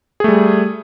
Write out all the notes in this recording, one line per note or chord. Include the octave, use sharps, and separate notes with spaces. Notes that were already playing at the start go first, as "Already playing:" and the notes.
G3 A3 G#4